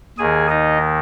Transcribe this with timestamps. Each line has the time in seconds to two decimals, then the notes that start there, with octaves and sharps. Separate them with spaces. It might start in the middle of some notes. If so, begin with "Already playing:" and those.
0.18 D#2 D#3 G#4 G#5
0.49 D#4 D#5